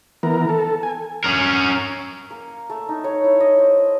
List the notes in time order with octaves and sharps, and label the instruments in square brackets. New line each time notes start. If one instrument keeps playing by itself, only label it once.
[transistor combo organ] E3 B3 A#4
A4
G#5
[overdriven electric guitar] C#4 A#4
[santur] A#3
A3
D#4
C#5
E4
D#5
C5